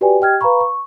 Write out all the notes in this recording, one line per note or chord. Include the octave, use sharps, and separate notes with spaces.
F#4 G4 B4 D5 G5 G#5
G4 D#5 G5 F6 G#6
B4 F5 A#5 B5 C#6
C#6